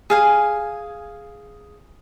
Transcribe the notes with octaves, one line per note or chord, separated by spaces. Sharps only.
G#4 F5 G#5